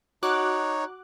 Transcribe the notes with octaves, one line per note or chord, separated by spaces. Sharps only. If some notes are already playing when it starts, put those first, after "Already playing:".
D#4 F#4 C#5 D6 F#6